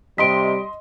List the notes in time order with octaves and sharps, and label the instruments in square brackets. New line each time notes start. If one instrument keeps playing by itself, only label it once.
[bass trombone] C3 [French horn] G3 [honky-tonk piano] D#5 C6 [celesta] B6 D7